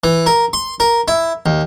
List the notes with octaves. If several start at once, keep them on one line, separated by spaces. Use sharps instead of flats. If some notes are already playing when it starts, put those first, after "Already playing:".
E3
A#4
C6
A#4
E4
D#2